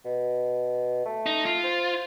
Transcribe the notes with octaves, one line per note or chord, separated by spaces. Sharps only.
B2
A3
D#4
F4
C5